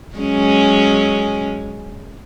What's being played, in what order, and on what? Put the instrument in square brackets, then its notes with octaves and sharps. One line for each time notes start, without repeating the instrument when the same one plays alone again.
[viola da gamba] F#3 G#3 C#4